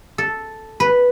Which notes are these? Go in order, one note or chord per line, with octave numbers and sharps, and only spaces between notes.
A4
B4